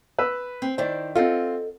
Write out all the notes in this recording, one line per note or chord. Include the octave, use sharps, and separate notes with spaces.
B4 E6
C4
D#3 E4 C5 D5
C4 F4 A4 D#5 F#5